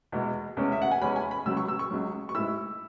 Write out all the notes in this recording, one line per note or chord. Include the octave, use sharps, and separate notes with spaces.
E2 B2 G#3
E2 C#3 G#3 C#4
E5
F#5
G#5
E2 C#3 G#3 C#4 B5
G#5
B5
C#2 C#3 F#3 E6
C#6
E6
C#6
C#2 C#3 F#3
C#6
G#2 G#3 E4 E6